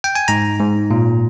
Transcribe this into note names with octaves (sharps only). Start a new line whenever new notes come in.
G5
G#5
G#2 A#5
G#2
A#2